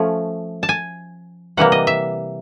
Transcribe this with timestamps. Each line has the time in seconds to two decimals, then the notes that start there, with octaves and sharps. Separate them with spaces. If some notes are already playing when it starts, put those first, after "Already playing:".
Already playing: F3 A3 C#4
0.63 A5
0.69 G#5
1.57 C3 E3 G3 A#3 F#5
1.72 D#5
1.87 E5